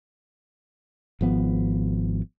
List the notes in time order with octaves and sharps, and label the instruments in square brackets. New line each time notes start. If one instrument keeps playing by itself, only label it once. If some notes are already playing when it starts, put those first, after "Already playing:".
[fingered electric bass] G#1 F3 B3